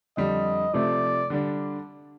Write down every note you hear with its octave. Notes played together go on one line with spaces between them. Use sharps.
F2 D3 G3 D#5
C3 F3 A3 D5
D3 G3 D4